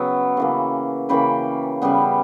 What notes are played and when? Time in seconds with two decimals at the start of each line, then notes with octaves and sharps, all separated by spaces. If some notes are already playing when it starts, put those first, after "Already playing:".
Already playing: C#3 F#3 B3 E5 G5
0.37 C#3 E3 A#3
1.09 C#3 E3 A#3 G5 B5
1.82 C#3 G3 B3